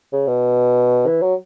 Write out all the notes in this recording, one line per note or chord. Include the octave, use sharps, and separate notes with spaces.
C#3
B2
E3
F#3